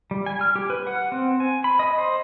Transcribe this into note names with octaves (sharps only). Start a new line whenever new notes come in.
G3
G#5
F6
G4
B4
F#5
C4
G#5
B5
D#5
C5